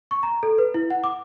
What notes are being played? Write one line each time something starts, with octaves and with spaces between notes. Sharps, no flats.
C#6
A#5
A4
B4
E4
F#5
D6